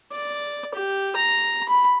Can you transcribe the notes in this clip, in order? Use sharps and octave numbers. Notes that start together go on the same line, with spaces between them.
D5
G4
A#5
B5